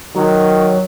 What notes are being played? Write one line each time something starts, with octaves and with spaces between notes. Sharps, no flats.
D#3 F#3